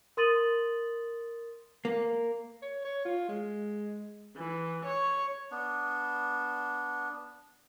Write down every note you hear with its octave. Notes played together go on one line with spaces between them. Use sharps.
A#4 C6 D#6 A6 D#7 F#7
A#3
C#5
C#5
F4
G#3
E3
C#5
B3 D4